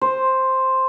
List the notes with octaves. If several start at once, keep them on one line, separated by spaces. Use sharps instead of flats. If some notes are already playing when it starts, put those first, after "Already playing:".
C5